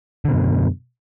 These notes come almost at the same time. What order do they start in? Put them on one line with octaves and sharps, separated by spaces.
D3 B2 F#2